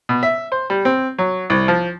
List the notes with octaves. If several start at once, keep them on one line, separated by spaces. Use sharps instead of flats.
B2
E5
C5
G3
C4
F#3
C2
F3